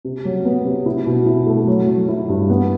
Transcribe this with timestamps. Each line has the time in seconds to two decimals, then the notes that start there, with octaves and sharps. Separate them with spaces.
0.05 C3
0.25 F#3
0.45 B3
0.65 C3
0.86 E4
1.06 B2
1.26 E4
1.47 A3
1.67 F#3
1.88 F#3
2.09 E4
2.29 G2
2.50 B3